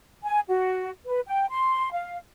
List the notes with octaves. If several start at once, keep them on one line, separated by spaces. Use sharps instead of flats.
G#5
F#4
B4
G5
C6
F5